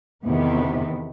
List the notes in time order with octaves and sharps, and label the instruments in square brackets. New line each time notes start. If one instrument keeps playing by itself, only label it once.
[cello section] E2 C3 D#3 B3